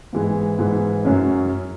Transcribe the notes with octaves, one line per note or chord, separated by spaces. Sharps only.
G#2 E3 G#3
G#2 E3 G#3
F#2 F#3 C#4